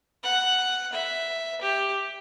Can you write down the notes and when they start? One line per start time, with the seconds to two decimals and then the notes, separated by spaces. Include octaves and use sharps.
0.23 F#5
0.92 E5
1.61 G4